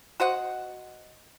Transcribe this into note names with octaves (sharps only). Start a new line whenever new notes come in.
F#4 C5 D#5 F#5